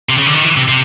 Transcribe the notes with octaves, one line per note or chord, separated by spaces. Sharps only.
C3
C#3
D3
D#3
E3
C3
C3